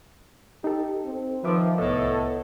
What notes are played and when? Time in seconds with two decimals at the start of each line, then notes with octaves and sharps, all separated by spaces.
0.64 D#4 G4 A4
1.05 C4
1.44 D#3 F3 B4 E5 D6
1.78 C2 A2 B3 A4 D#5